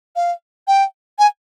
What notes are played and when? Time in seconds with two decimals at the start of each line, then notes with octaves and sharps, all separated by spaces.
0.16 F5
0.68 G5
1.19 G#5